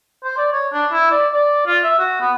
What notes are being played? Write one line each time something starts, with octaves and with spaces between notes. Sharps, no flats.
C5
D5
C#5
D4
E4
D5
D5
F4
E5
F#4
B3